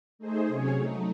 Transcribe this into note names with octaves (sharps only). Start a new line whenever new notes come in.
A3 D#4 G#4 C5
C3 F#3 C#4 G#4 C#5
F#3 A3 D#4